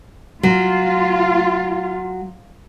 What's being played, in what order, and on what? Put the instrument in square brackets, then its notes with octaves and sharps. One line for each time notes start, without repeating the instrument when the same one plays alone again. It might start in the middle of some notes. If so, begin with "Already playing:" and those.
[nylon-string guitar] F#3 [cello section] F4